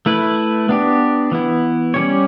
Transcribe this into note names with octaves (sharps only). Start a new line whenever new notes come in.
A3 E4 B4
B3 D4 G4
E3 B3 E4
G3 C#4 G4 C#5